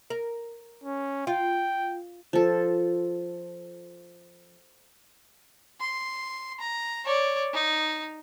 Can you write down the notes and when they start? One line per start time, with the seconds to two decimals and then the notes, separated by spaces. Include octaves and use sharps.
0.10 A#4
0.84 C#4
1.27 F4 G5
2.33 F3 A4
5.80 C6
6.60 A#5
7.05 C#5 D5
7.53 D#4